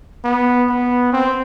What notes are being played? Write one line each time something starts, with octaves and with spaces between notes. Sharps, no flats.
B3
B3
C4